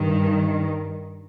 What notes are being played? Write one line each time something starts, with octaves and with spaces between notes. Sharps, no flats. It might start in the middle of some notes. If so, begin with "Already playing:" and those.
Already playing: G2 D#3